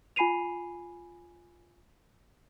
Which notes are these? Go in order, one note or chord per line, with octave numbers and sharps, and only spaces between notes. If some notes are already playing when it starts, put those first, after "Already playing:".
F4 G#5 B5 C7 D#7 F7